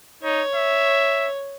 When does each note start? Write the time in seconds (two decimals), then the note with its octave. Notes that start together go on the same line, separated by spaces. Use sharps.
0.23 D#4 C#5
0.55 E5